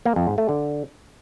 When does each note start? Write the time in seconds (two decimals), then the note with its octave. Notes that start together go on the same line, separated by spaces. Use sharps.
0.05 A#3
0.16 F2
0.27 G#2
0.38 A3
0.49 D3